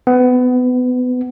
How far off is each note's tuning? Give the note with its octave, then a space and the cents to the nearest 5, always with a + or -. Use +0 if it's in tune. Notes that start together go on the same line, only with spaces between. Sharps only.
B3 +25